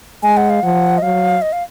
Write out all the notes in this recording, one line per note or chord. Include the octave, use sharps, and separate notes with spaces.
G#3 G#5
F#5
F5
F3 F#5
D#5
F#3 F5
D#5
F5